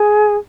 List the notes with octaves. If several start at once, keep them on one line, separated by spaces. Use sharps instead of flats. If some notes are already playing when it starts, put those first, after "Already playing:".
Already playing: G#4